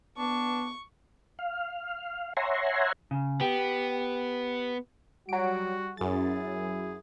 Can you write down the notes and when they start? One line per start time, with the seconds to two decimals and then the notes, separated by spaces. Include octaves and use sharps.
0.18 B3 D4 C#6
1.39 F5
2.37 C#5 E5 F#5 G#5 A#5 C6
3.11 C#3
3.41 B3 G4
5.29 F#3 G3 F#4 D7
5.97 F#2 F#3 E4 G#4 A6